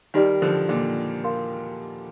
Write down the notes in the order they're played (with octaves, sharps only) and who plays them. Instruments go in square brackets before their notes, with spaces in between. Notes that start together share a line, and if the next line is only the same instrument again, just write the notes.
[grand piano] D#3 G3 [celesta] D#4 G4 D5
[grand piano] D3 F3
A#2 D3
[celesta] A#4 F5 C6